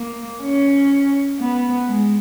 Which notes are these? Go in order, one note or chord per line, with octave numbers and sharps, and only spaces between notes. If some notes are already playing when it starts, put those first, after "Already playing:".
Already playing: A#3
C#4
B3
G#3